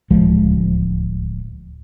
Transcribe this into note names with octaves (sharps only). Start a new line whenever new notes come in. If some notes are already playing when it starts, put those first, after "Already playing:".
D1 C#2 F3 G#3